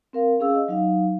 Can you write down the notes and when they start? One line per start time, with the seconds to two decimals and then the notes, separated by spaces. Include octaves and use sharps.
0.13 C4 A#4 F5
0.40 C#4 G#4 F5 E6
0.55 D#5
0.68 F#3 D#4 F5